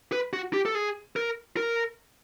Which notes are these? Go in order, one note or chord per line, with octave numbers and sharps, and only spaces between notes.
B4
F#4
G4
A4
G#4
A#4
A#4